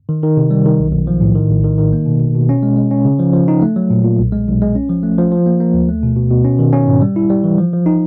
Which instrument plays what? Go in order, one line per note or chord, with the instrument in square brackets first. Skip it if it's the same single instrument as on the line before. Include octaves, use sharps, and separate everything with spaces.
[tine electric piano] D#3
D#3
C3
G3
D#3
B1
B1
F3
A2
D#3
A#1
D#3
D#3
A#3
B2
B2
B2
C#4
G#3
G#3
C#4
C#3
F3
F3
D#4
A3
F#3
A#2
A#2
B1
G#3
B1
G#3
C#4
F3
A3
F3
F3
A#3
A#3
D2
A3
B2
B2
B2
C#4
D#3
C#4
G#2
G3
E4
G3
E3
F3
F3
D#4